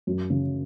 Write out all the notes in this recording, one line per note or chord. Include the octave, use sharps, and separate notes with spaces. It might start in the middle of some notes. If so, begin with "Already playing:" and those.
F#2
C#3